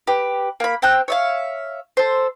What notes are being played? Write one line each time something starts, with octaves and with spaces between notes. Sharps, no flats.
G4 B4
A#3 B5
C4 G5 E6 F#6
C#5 E5 F5
A4 C5